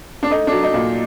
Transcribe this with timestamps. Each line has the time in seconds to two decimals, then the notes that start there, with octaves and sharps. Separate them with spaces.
0.23 D4
0.30 A3 D#4
0.47 F#3 D4
0.63 D#4
0.74 A#2